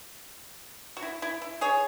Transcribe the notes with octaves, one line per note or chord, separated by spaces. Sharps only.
F#4
E4
E4
E4
G#4 C#5